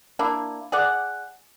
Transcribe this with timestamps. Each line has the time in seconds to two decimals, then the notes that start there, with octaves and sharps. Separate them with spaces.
0.19 A#3 D4 E4
0.72 G#4 D5 F#5